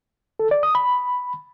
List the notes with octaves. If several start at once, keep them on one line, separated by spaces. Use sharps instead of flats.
A4
D5
D#6
B5